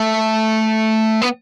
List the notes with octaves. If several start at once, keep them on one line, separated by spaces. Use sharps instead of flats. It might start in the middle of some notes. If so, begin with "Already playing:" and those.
Already playing: A3
B3